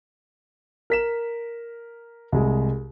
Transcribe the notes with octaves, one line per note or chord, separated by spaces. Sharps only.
A#4 B6 E7
C2 G#3